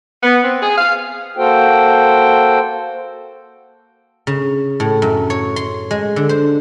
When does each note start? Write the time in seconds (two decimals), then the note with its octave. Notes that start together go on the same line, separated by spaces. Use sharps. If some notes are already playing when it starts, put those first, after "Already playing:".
0.23 B3
0.44 C4
0.62 G#4
0.77 F5
1.37 A#3 F#4 A4 C5 G5
4.27 C#3
4.80 A2
5.02 F#2
5.30 C#5
5.56 C6
5.91 G#3
6.16 D3
6.29 C5